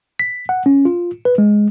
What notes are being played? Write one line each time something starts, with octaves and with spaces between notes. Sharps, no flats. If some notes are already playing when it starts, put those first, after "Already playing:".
B6
F#5
C#4
F4
B4
G#3